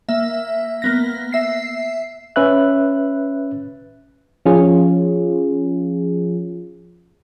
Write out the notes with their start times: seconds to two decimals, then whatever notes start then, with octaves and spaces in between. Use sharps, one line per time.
0.09 A#3 E5
0.82 A#3 B3 A#6
1.33 E5 C7
2.36 C#4 B4 E5 F#6
4.46 F3 C#4 F4 G#4